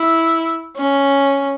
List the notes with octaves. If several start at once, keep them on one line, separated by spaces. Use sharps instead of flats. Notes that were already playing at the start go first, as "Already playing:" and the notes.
Already playing: E4
C#4